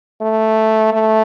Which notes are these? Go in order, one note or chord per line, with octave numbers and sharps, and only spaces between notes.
A3
A3